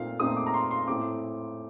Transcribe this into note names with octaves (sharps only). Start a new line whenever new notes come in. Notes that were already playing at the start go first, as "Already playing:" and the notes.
Already playing: A#2 A3 C4 D#4 F5
A#2 A3 C4 D#4 D#6
D6
A#5
C6
C6
A2 A3 C4 D6